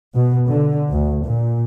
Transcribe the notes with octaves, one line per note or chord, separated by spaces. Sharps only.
B2
D3
D2
A#2